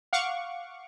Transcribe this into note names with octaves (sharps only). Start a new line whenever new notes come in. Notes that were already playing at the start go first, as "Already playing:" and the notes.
F5 F#5 C#6 D6